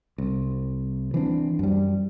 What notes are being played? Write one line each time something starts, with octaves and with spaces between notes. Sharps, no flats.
C2
E3 C4 D4
F#2 G3